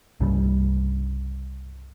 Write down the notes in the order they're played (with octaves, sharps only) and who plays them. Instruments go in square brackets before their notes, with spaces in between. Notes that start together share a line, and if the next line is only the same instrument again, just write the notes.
[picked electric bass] C2 G2 C#3 G3